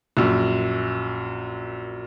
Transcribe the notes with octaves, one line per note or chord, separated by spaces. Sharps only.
A#1 F#2